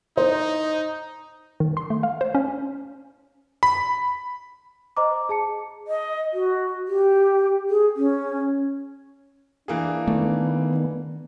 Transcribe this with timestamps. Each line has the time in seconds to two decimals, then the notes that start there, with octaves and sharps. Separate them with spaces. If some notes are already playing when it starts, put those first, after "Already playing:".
0.17 D#4 C5
1.60 D#3
1.77 C6
1.90 A3
2.03 F5
2.21 C5
2.35 C#4
3.63 B5
4.97 C5 D#5 A#5 D6
5.29 G#4 A5 C#7
5.88 D#5
6.33 F#4
6.88 G4
7.70 G#4
7.96 C#4
9.68 E3 A#3 D4 G#4
10.07 D#3 A3 B3